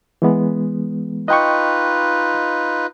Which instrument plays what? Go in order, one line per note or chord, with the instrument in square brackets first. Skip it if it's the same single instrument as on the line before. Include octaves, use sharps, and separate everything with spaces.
[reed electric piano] E3 G#3 B3
[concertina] D#4 F4 B4 [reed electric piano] D#5 G5 C#6